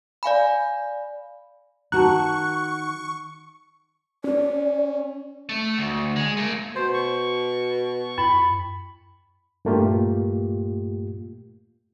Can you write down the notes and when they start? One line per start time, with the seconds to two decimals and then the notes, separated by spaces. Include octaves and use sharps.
0.23 D5 F5 G#5 B5
1.92 D#3 F#4 A5 A#5 C#6 F#6
4.24 C#4 D5
5.49 A3
5.78 D2
6.16 G#3
6.37 A3 A#3
6.75 B2 C5
6.94 C#6
8.18 F#2 B5
9.65 G2 A#2 A3 A#3 F4 G4